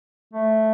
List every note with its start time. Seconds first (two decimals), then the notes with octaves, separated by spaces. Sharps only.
0.33 A3